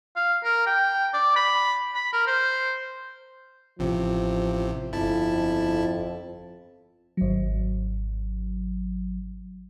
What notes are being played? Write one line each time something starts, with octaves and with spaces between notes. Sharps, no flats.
F5
A#4
G5
D5
B5
B5
A#4
C5
A1 C3 F3
G1 F2 E4 A5
G#1 F#3